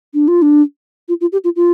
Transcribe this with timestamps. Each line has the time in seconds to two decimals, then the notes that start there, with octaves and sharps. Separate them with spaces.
0.14 D4
0.28 F4
0.42 D4
1.09 F4
1.21 F4
1.32 G4
1.44 F4
1.56 F4